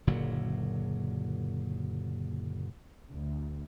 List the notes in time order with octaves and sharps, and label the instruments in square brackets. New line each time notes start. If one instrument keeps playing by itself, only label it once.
[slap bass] F#1 A#2 D3 F#3
[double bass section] D2